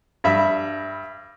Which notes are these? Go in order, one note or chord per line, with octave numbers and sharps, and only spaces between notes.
G2 E5 B5